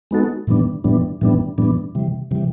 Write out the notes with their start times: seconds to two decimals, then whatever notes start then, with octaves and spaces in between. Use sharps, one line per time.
0.11 G#3 B3 D#4 F#4 A4
0.47 A2 E3 G3 B3 D4
0.84 A2 E3 G3 B3 D4
1.21 A2 E3 G3 B3 D4
1.58 A2 E3 G3 B3 D4
1.95 C3 E3 G3
2.31 C3 E3 G3